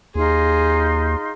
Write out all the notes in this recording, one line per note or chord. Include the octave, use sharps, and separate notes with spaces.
D#2 D#4 F4 G#4 C6